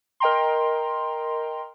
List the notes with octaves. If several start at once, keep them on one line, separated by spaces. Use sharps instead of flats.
A#4 D#5 G5 A#5 C6